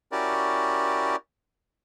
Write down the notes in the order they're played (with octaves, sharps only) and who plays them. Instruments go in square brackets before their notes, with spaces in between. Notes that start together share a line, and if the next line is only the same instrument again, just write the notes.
[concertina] C#4 E4 F#4 G4 A#4 D5